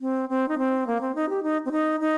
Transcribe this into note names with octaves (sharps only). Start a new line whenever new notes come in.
C4
C4
D#4
C4
A#3
C4
D#4
G4
D#4
C4
D#4
D#4